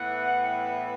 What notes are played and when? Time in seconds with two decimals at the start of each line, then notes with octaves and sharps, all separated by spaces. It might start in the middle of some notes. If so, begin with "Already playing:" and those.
Already playing: A2 E3 B3 F#5
0.42 G5